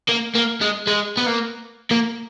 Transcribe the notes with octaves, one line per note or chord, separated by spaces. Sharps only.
A#3
A#3
G#3
G#3
B3
A#3
A#3